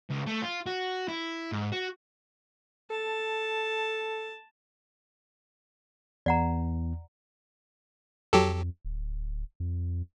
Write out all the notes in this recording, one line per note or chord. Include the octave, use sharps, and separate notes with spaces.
C#2
A3
F4
F#4
E4
G#2
F#4
A4 A5
E2 D5 F#5 A#5
F2 F#3 G4 A4
D1
F2